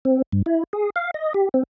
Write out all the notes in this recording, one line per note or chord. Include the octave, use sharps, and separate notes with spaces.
C4
G2
E4
G#4
F5
D#5
G4
C4